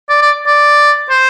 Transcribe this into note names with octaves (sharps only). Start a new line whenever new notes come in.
D5
D5
D5
C5